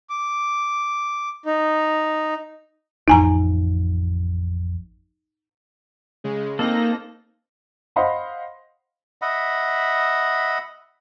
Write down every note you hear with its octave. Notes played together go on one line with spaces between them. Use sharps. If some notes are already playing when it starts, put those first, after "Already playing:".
D6
D#4
A1 F2 D#4 G#5 A#5
C#3 G#3
A#3 C4 D#4 A4 A#6
C5 D#5 F5 F#5 B5 C6
D#5 E5 F#5 B5